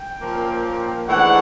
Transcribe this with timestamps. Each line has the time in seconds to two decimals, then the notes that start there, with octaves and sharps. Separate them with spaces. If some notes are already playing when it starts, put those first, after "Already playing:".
Already playing: G5
0.19 A#2 F3 A#3 C#4
1.07 G#2 E3 A3 D4 F#5